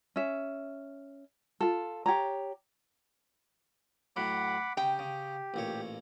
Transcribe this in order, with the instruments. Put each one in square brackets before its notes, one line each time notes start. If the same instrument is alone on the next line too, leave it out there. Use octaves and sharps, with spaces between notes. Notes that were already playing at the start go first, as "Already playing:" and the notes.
[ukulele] C#4 E5
F4 A4
G4 C#5 A#5
[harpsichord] A2 F#3 [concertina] F#5 B5 D6
[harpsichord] C#3 [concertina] G4 [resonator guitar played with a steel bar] G5
[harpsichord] C#3
A1 A#2 C#5